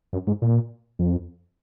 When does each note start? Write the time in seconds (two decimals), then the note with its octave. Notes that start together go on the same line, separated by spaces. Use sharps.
0.13 F#2
0.27 G#2
0.42 A#2
0.99 F2